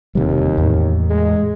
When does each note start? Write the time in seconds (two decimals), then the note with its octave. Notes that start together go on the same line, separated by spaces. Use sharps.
0.15 E1 D#2 C3 G3
0.58 E2 A2
1.10 G#3